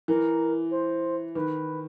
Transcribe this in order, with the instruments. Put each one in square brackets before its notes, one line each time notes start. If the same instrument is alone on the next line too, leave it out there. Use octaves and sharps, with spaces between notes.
[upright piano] E3 [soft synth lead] A#4
[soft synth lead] C5
[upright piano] D#3 [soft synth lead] B4